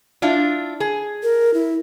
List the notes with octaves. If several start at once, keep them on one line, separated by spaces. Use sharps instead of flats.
D4 E4 F4
G#4
A#4
E4